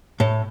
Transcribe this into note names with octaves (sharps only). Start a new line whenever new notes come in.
A2